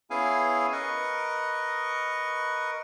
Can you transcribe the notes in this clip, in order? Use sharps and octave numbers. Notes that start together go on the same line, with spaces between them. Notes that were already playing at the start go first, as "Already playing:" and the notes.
B3 C#4 E4 G#4 F5 G#5
A#4 B4 D#5 C#6